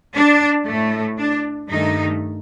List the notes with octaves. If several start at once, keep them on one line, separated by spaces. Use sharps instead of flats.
D4
A2 A3
D4
G2 D#3 A3 D#4